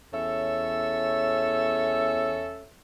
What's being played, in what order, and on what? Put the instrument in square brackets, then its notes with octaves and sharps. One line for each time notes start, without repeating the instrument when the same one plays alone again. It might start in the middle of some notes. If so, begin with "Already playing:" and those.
[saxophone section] E2 C#4 A4 C#5 E5